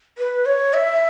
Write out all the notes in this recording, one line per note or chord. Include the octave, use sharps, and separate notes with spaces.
B4
C#5
E5